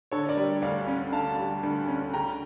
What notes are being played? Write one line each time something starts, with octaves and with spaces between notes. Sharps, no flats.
D3 A4 C#5
A#4 D5
G3
D2 D5 F5
C#4
D3 F5 A5
G3
D2
C#4
C#3 G5 A#5